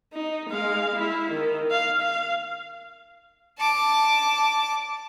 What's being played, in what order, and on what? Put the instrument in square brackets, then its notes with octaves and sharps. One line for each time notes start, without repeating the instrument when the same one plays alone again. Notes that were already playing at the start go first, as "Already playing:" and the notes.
[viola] D#4
G#3 F5
E4
D#3
F5
F5
[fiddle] A5 D6